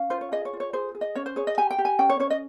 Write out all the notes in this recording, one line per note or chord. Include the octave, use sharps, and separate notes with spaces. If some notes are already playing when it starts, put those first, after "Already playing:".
Already playing: C#4 F5
F4 C5
C#5
G#4 D#5
C#5
F4
C#5
G#4 C5
G#4
D#5
C#4 C#5
C5
G#4 C#5
D#5
G4 G#5
G5
G4
G#5
C#4 G5
C#5
C#4 C#5
D#5